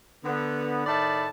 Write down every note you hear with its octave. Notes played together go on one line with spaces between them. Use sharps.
D3 B3
A2 D#3 A3 D5 A5 B5